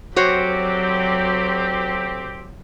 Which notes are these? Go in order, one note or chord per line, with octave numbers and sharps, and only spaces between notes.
D2 F#3 C4 F#4 G4 C5 C#5